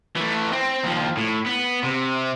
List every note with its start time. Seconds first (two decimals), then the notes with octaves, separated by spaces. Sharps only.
0.16 E3 A3
0.52 C4
0.84 D#2 F3
1.17 A2
1.46 B3
1.83 C3